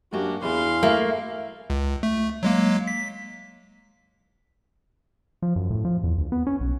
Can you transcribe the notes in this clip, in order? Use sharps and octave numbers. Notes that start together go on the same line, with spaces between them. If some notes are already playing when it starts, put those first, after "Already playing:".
F#2 A#3 D4 F#4 G4
E2 E4 G#4 F5 C6
A3 A#3
C#2
A3
F#3 G#3 A#3
B6
F3
F#2
A2
F3
E2
D2
B3
C#4
B1